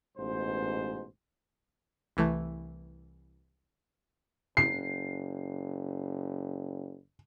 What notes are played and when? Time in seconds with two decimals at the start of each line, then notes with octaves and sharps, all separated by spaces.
0.17 A1 G#2 B2 C5
2.17 C2 E3 A3
4.57 F#1 C7